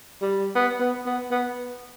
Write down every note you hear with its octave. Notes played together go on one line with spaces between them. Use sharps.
G3
B3
B3
B3
B3